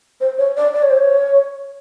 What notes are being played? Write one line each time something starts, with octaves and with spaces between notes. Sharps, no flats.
C5
C#5
D5
D5
C#5
C5
C#5